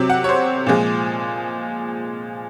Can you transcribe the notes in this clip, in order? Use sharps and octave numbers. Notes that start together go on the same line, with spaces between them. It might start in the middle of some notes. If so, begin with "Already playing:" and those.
Already playing: C3 F#3 C4
F#5
C#5
C5
A#2 F3 G#3